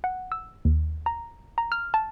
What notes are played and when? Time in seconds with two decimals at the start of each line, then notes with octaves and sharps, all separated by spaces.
0.04 F#5
0.32 E6
0.65 D#2
1.06 A#5
1.58 A#5
1.72 F6
1.94 A5